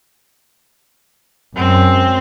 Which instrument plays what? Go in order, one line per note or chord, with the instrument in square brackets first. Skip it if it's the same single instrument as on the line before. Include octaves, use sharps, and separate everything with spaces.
[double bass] F#2 G#3 [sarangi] C4